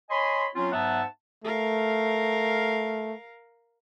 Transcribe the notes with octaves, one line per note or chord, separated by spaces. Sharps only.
C#5 D#5 G#5 B5 C6
F#3 C4 C#4 F4
G#2 F#3 B3 E5 F#5 A5
A3 A#4 F5